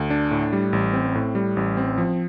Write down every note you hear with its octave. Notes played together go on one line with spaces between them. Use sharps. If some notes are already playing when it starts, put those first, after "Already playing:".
Already playing: D2
D4
A2
G3
A1
C4
A2
G3
A1
C4
F3